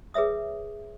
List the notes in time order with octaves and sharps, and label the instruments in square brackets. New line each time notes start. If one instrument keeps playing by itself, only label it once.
[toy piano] G#4 B4 C#5 E5 D#6